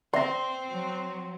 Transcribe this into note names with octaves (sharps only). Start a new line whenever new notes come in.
C4 D5 E5 C6 A#6
F#3